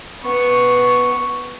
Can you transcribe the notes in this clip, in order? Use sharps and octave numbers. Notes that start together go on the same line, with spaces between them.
B3 C#6